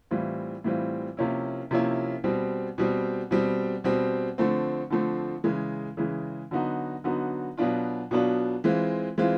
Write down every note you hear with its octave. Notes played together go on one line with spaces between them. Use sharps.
A2 E3 G3 C4 F4
A2 E3 G3 C4 F4
C3 F3 A#3 C#4 E4
C3 F3 A#3 C#4 E4
B2 G3 C4
B2 G3 C4
B2 G3 C4
B2 G3 C4
D3 F3 A3 C4
D3 F3 A3 C4
C#3 E3 G#3
C#3 E3 G#3
D3 F#3 B3 D#4 F#4
D3 F#3 B3 D#4 F#4
B2 F#3 B3 D4 F4
B2 F#3 B3 D4 F4
E3 G#3 C4 F4
E3 G#3 C4 F4